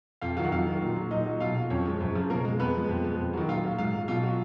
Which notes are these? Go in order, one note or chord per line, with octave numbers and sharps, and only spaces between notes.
F2 F4 F5
D#3 F#3 F4 F5
F#5
F2 F4 F5
D#3 F#3
A#2
F#3
A#2 D#4 D#5
F#3
B2 F4 F5
F#3
F2 C#4 C#5
F3 G#3
F#2
C#3 F3
B2 A#3 A#4
G#3
F2 B3 B4
F3 G#3
F2
F3 G#3
F2
D#3 F#3
A#2 F4 F5
F#3
G#2 F4 F5
F#3
B2 F4 F5
F#3